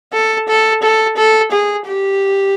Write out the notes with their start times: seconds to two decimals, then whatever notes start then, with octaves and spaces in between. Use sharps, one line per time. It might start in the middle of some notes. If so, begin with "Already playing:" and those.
0.13 A4
0.48 A4
0.83 A4
1.17 A4
1.51 G#4
1.87 G4